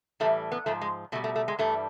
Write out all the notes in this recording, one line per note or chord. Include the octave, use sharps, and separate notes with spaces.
A2 E3 G3 A3
B3
G#2 F3 A3
G#3
B2 G3 A3
A3
A3
G#3
G2 E3 G3 A3